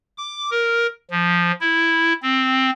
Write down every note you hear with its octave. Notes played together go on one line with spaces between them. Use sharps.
D6
A#4
F3
E4
C4